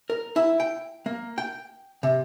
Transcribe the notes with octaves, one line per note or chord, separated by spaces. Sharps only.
A#4
E4
G5
A#3
G5
C3